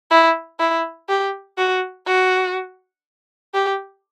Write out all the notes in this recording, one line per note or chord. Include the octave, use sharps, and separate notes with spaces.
E4
E4
G4
F#4
F#4
G4